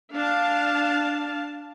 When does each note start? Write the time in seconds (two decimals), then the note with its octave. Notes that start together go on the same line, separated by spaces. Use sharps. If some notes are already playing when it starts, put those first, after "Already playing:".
0.13 D4 F5 A5